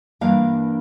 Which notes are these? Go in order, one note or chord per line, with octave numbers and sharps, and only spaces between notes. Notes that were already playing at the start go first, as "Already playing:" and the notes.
G2 E3 A#3 D4 F5